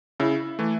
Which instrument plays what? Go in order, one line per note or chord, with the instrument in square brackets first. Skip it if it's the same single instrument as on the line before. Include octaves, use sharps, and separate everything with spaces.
[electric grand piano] C#3 [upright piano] E4
[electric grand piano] E3 A3